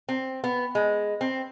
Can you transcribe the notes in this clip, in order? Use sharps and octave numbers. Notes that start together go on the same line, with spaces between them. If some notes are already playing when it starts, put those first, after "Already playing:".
C4
B3
G#3
C4